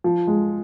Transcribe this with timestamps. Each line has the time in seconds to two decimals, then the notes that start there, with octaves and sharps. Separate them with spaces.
0.04 F3
0.27 G#3